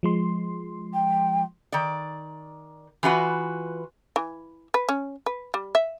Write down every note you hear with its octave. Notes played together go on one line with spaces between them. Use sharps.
F3 G#3 C6
G5
D#3 D5
E3 F4 F#4 B4
E3
B4
C#4
B4
G3
E5